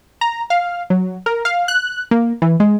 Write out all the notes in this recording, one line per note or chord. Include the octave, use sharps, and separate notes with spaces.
A#5
F5
F#3
A#4
F5
F#6
A#3
E3
G#3